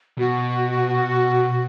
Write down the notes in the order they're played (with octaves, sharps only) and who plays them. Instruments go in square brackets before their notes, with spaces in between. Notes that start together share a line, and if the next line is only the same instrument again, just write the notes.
[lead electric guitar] B2 [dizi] F#4